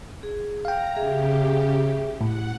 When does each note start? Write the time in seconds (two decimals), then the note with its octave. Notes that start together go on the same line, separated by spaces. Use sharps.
0.23 G#4
0.65 F5 G5 A#5
0.95 C#3 G4 G#4 E5
2.21 A2 F#5